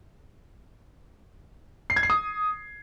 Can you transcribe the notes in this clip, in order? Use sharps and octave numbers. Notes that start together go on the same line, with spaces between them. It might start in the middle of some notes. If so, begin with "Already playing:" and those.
C7
G#6
C7
D#6